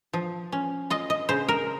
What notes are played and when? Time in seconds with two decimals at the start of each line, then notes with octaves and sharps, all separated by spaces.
0.13 F3
0.52 C#4
0.90 F4 D#5
1.10 D#5
1.29 C#3 C5
1.48 A#4